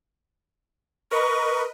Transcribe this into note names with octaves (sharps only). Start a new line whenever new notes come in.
A#4 B4 D#5 C#6